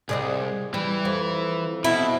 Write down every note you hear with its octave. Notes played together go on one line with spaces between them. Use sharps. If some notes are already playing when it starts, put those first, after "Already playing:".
C2 G#4 D5 D#5
E3 G3
F2
B2 E4